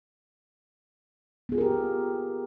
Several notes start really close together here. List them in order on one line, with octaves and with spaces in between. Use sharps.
B3 G#4 F4 A#4 G4